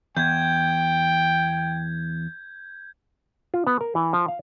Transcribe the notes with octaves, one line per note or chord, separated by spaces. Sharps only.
E2 G5 G6 G#6
F4
B3
A#4
E3
F3
F5